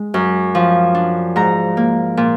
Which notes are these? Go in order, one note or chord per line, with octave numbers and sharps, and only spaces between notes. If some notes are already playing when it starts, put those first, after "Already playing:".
Already playing: G#3
F#2
F3
D4
G#2 A#5
A#3
A#2